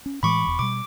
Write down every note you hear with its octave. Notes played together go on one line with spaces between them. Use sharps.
C#4
A2 E3 G#3 B5 C#6 D6
E1 E2
B2 G3 D6